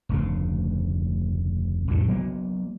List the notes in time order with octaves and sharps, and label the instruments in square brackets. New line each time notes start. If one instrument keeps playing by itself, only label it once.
[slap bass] F1 D2 C#3
C2 F2 A2 D3
F#3 A#3 B3